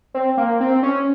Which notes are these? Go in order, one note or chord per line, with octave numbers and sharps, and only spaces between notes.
C4
A#3
C4
C#4